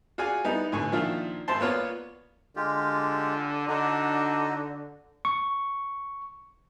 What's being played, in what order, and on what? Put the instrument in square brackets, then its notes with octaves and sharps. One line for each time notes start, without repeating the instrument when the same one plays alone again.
[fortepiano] F4 F#4 G#4 D5 G#5
G3 B3 D#4 E4
A1 D3 G#5 C#6
A#2 D#3 F3 D4 E4 F4
G#1 C5 A5 C6
A#3 B3 F4 C#5 D5
[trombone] D3 [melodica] G#3 F4 G4
[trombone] D3 [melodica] D4 D#4 F#4
[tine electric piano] C#6